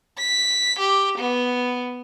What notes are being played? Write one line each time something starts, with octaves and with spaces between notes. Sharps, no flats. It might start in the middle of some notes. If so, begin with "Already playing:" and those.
B6
G4
B3